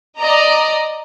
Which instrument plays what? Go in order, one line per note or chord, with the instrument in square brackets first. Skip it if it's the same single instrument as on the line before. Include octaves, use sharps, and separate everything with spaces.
[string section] D5 D#5 A#5